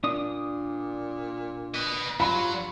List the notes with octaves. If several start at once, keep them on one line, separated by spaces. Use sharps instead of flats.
A#2 D4 D#6
B4 D#5
G2 F#3 F4 B5